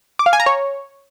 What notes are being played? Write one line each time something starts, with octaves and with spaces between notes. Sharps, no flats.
D6
F5
G#5
A#5
C#5